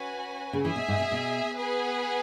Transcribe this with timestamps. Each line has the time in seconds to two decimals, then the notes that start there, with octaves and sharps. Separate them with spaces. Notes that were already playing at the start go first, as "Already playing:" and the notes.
Already playing: C#4 F#4 B4 G#5
0.53 C#3
0.64 E3 G#4 E5 G#5
0.76 B2
0.88 G#2
1.00 B2
1.12 B2
1.59 B3 G#4 B4 G#5